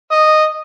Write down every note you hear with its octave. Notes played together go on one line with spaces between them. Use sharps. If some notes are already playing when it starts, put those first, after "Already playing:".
D#5